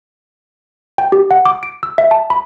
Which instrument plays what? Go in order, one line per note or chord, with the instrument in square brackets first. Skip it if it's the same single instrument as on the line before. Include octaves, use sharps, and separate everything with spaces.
[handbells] G5
G4
F#5
D6
D7
E6
E5
A5
B5